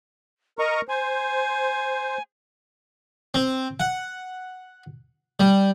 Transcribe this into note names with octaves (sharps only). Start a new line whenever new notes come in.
A#4 D#5 A#5 C#6
C5 G#5
C4
F#5
G3